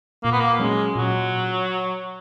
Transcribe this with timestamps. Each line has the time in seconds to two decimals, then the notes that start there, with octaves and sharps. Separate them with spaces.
0.24 A#2 A#3
0.32 B3
0.40 A#3
0.59 F#3 G#3 C#4
0.95 A#2 F#3